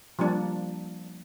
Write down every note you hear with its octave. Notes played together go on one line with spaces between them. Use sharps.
F3 G3 A#3 D4